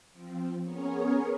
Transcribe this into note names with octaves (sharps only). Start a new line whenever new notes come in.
F3 C4
B3 C#4 G#4 A#4 C#5